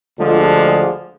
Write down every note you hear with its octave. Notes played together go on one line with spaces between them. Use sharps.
D2 D3 F3 G#3 F4
G#4